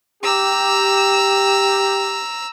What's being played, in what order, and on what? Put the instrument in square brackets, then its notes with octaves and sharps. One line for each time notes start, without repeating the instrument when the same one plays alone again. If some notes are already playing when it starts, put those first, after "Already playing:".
[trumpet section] G4 [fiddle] A#5 E6